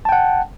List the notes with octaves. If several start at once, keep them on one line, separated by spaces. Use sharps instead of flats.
F#5 G5 A5